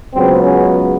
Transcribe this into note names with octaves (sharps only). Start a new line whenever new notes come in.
C#2 C#3 F#3 B3 C4
C#4